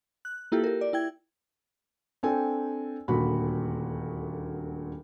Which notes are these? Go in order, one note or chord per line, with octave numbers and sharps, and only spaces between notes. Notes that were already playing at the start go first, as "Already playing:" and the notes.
F#6
A#3 E4 F4 G4 A4
G4 A#4
D5
E4 G5 G#6
C4 D4 A4 G5 G#5
D#1 D2 A#2 F#4 B5